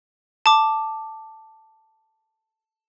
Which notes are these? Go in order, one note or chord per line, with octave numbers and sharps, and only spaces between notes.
A5 D6